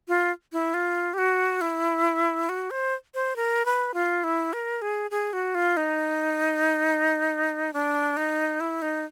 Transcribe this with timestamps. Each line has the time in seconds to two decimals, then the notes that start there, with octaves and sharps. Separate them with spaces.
0.08 F4
0.53 E4
0.74 F4
1.14 G4
1.18 F#4
1.61 E4
2.49 F#4
2.71 C5
3.14 C5
3.36 A#4
3.65 B4
3.94 F4
4.24 E4
4.53 A#4
4.82 G#4
5.11 G#4
5.33 F#4
5.55 F4
5.77 D#4
7.73 D4
8.17 D#4
8.60 E4
8.82 D#4